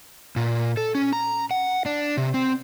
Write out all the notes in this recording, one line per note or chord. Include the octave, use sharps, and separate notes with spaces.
A#2
A4
C#4
A#5
F#5
D4
C3
C4